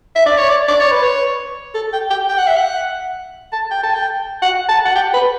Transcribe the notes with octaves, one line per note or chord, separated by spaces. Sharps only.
E5
D5
C#5
D5
D5
C#5
B4
C#5
A4
G5
G5
G5
F#5
E5
F#5
A5
G5
A5
G5
F#5
A5
F#5
G5
B4